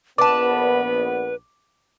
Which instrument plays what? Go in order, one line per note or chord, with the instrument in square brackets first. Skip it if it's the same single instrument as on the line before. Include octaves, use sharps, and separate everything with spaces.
[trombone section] A#1 B3 [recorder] B4 [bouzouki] D5 A5 [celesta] D6